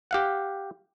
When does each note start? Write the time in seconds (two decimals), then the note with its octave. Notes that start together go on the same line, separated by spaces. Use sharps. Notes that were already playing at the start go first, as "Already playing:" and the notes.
0.11 G4 F5 F#5